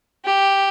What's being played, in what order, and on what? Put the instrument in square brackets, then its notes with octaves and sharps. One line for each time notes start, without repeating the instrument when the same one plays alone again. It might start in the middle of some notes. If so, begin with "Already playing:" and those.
[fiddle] G4